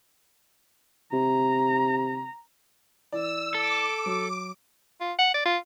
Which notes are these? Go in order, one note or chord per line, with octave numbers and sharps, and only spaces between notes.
C3 A#5
E3 D5 E6
A4 D6
F#3
F4
F#5
D5
F4